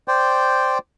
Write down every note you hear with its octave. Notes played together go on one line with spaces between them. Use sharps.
C5 D5 G5